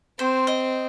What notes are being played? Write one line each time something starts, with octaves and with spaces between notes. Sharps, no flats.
C4 C5
D#5